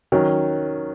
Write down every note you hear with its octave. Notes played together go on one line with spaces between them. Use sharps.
D#3 F#3 C#4